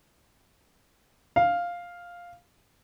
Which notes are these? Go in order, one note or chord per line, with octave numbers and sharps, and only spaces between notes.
F5